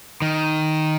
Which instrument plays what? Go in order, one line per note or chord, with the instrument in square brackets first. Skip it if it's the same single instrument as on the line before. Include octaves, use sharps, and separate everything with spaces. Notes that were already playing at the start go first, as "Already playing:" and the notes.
[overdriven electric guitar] D#3